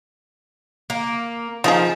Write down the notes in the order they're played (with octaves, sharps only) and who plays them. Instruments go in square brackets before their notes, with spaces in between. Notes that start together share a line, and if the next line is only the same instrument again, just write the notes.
[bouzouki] A#3
[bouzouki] F3 [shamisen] D#4 G4 G#4